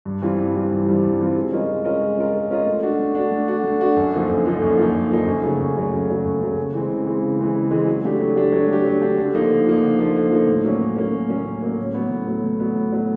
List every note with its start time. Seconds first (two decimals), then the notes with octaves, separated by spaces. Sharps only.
0.05 G2
0.22 E3 G3 C4 F4
0.38 G2
0.55 E3 G3 C4 F4
0.71 G2
0.87 E3 G3 C4 F4
1.04 G2
1.20 E3 G3 C4 F4
1.36 G#3
1.52 C#4 F4 A#4 D#5
1.68 G#3
1.85 C#4 F4 A#4 D#5
2.01 G#3
2.18 C#4 F4 A#4 D#5
2.34 G#3
2.51 C#4 F4 A#4 D#5
2.66 A3
2.83 D4 F#4
2.99 A3
3.15 D4 F#4
3.31 A3
3.48 D4 F#4
3.64 A3
3.81 D4 F#4
3.96 F#2
4.13 D3 F3 A#3 D#4
4.29 F#2
4.45 D3 F3 A#3 D#4
4.62 F#2
4.78 D3 F3 A#3 D#4
4.94 F#2
5.10 D3 F3 A#3 D#4
5.26 F#2
5.43 C#3 F#3 A3
5.60 F#2
5.76 C#3 F#3 A3
5.92 F#2
6.09 C#3 F#3 A3
6.24 F#2
6.41 C#3 F#3 A3
6.58 C#3
6.73 E3 G#3 C4
6.90 C#3
7.06 E3 G#3 C4
7.22 C#3
7.39 E3 G#3 C4
7.55 C#3
7.71 E3 G#3 C4
7.87 F#3
8.04 A3 D4 G4
8.20 F#3
8.36 A3 D4 G4
8.52 F#3
8.69 A3 D4 G4
8.85 F#3
9.02 A3 D4 G4
9.17 D3
9.34 F3 A#3 D#4
9.50 D3
9.67 F3 A#3 D#4
9.83 D3
9.99 F3 A#3 D#4
10.16 D3
10.31 F3 A#3 D#4
10.48 A2
10.64 F#3 A#3 C#4
10.81 A2
10.96 F#3 A#3 C#4
11.13 A2
11.29 F#3 A#3 C#4
11.45 A2
11.62 F#3 A#3 C#4
11.78 A2
11.94 F#3 B3
12.11 A2
12.28 F#3 B3
12.44 A2
12.60 F#3 B3
12.76 A2
12.92 F#3 B3